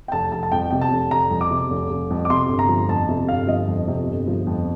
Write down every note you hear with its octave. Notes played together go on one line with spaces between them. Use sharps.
G5
F1 A5
F1 A5
A5
F2 G5
C3 G5
A5
F1
F1 A#5
F2
D6
C3
F1
F1
F2
D6
C3 C6
G1
A#5
F3
F2 A5
C3
G1 F5
F3 D#5
F2
C3
G1
F3
F2